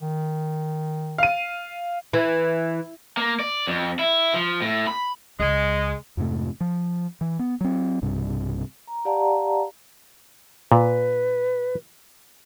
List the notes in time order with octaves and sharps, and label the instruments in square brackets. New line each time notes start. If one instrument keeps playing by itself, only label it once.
[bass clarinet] D#3
[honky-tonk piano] F5 D#7
[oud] E3
[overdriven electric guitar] A#3
D5
F2
E4
F3
A2
B5
[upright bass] C#2 [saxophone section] G#3
[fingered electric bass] F2 G#2 C3 A3
F3
E3
B3
F#3 C4
B1 G2 C3 G3
[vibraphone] A#5
G4 D5 F5 F#5 A5 A#5
[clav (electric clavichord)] A#2 [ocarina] B4